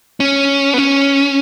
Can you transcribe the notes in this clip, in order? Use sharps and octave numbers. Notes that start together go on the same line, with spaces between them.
C#4
B3
C#4